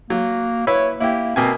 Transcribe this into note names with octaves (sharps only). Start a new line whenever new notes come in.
F#3 A#3
E4 B4 C#5 E5
A#3 E4 G4
B2 A#3 C4 G#5